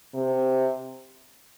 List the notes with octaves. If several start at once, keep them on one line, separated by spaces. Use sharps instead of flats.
C3